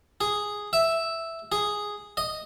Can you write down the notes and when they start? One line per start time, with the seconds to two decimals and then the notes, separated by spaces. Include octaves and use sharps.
0.21 G#4
0.73 E5
1.52 G#4
2.17 D#5